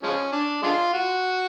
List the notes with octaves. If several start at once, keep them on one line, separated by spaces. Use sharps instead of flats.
F3 G#3 C#4
D4
G#3 D4 F4
F#4